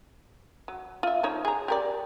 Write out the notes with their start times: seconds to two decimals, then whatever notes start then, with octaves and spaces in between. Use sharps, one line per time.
0.68 F#3
1.03 F4 E5
1.23 F3 D#4 C#5
1.45 G#4 A#5
1.68 G4 A#4 D5